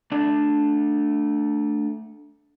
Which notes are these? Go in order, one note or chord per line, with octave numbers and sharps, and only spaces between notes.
A3 D4 D5 A5